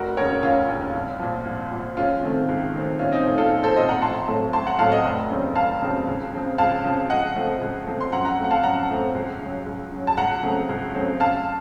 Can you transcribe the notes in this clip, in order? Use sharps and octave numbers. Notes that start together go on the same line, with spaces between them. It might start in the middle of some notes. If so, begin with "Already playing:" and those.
Already playing: F1 F#4 A#4
D#2 C#3 A#4 C#5
F1 C#4 F4
D#2 C#3
C2
A#2 F3
C2
A#2 F3
C#2 C#4 F4
C3 D#3 A3 C4
C#2
C3 D#3 A3 C4
A#1 C#4 F4
C4 D#4
A#2 F3 A3 C4 C#4
F4 A4
A#1
A4 C5
A#2 F3 A3 C4 C5 D#5
F#5 A#5
A1 A5 C6
A2 F#3 A3 C4
A1 A5 C6
F#5 A#5
A2 F#3 A3 C4 F5 A5
D#5 F#5
F1
D#2 C#3 F#3 C4
F1 F5 A5
D#2 C#3 F#3 C4
C#2
C#3 F3 C4
C#2 F5 A5
C#3 F3 C4
C#2 D#5 F#5
C3 F3 A3 C4
C#2
C3 F3 A3 C4
C6
F#2 F#5 A#5
F#5 A#5
F3 A3 C4
F#5
F5 A5
F#2 F#5 A#5
F3 A3 C4
C#2
C#3 F#3
C#2
C#3 F#3
A5
C#2 F#5 A#5
C#3 F#3 A3 C4
C#2
C#3 F#3 A3 C4
F#2 F5 A5